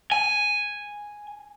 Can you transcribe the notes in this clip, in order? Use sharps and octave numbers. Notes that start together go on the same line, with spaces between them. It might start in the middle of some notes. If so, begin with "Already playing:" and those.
G#5